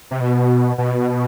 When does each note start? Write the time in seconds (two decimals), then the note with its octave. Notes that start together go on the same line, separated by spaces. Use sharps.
0.11 C3
0.20 B2
0.78 B2